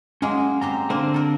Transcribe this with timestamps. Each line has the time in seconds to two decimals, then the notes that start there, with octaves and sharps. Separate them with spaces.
0.22 F#3 G#3 A#3 C#4
0.61 C4 G4 C5 A#5
0.90 D3 A#3 C4
1.14 A4 A#4